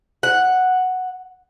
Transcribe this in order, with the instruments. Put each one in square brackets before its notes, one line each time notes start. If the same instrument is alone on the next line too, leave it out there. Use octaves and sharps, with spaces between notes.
[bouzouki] F#5